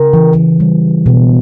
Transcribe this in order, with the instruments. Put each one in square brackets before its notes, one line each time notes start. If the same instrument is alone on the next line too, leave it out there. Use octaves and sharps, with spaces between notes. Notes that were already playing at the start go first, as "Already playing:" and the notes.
Already playing: [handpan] C#3 [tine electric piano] A#4
[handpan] E3
G3
B2